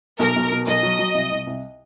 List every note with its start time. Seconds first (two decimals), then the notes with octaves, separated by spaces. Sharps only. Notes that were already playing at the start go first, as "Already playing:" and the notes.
0.19 B1 A#4
0.36 B1
0.52 B2
0.67 B1 D#5
0.83 F#3
0.99 F#3
1.14 C2
1.31 C2
1.47 C2